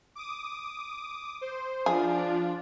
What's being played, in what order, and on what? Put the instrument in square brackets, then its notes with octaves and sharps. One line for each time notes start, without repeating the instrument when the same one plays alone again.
[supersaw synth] D6 D#6
C5
[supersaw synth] F3 [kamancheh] D4 F4 [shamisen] G#4